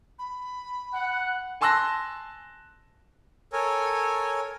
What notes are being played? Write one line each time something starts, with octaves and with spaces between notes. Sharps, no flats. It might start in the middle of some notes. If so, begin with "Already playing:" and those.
B5
F#5 F#6
G#5 A5 C6 E6 F#6 A#6
A4 A#4 C#5 G#5